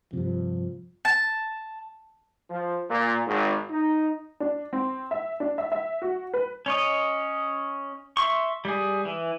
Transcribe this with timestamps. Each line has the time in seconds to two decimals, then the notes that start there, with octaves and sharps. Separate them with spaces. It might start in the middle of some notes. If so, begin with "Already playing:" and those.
0.13 G2 C3 F3
1.05 A5
2.50 F3
2.90 A#2
3.26 G#1
3.70 D#4
4.40 D4
4.73 C4
5.11 E5
5.40 D4
5.58 E5
5.72 E5
6.02 F#4
6.34 B4
6.66 C#4 C#5 D#5
8.17 E5 C6 C#6
8.65 G3 G#4
9.05 E3